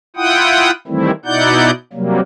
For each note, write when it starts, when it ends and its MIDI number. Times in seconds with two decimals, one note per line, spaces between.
0.16 0.71 64
0.16 0.71 65
0.16 0.71 78
0.16 0.71 79
0.16 0.71 87
0.88 1.11 51
0.88 1.11 52
0.88 1.11 55
0.88 1.11 57
0.88 1.11 60
0.88 1.11 64
1.25 1.71 47
1.25 1.71 63
1.25 1.71 64
1.25 1.71 74
1.25 1.71 78
1.25 1.71 91
1.93 2.20 48
1.93 2.20 54
1.93 2.20 55
1.93 2.20 58